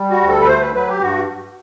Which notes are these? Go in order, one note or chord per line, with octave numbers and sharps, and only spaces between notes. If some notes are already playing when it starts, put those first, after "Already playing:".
Already playing: G3
F#4
D2
A4
B4
A3 C5
B4
F#3 B4
G4
G2 F#4